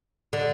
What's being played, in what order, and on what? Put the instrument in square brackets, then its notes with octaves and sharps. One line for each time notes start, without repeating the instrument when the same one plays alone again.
[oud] D3